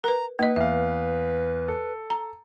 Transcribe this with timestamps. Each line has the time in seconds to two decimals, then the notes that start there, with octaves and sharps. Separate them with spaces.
0.04 A#4 B4 A#5
0.39 A#3 D#4 B4 D#5
0.56 E2 E5 F5
1.68 A4
2.10 A#5